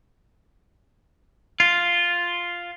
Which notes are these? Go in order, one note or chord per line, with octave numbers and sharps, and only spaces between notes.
F4